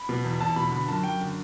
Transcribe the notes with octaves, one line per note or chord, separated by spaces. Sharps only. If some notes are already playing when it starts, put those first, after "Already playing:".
Already playing: B5
B2
E2
E2 A5
B2 B5
D3 B5
F#2 A5
F#2 G5
D3